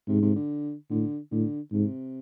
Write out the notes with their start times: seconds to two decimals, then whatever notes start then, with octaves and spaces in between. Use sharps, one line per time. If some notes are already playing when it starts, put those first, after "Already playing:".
0.08 G#2 C3
0.22 C3
0.36 D3
0.91 A2 D3
1.31 A2 D3
1.72 G#2 C3